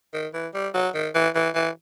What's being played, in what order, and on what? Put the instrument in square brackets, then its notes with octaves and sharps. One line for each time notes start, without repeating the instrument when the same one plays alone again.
[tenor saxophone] D#3
E3
G3
F#3
D#3
E3
E3
E3